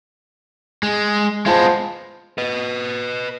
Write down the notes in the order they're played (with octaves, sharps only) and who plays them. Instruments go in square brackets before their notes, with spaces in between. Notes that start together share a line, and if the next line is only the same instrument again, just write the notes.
[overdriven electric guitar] G#3
[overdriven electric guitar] G#3 B3 [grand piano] F4 C5 A5
[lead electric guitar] B4 D#5